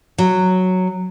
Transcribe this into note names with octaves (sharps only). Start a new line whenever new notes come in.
F#3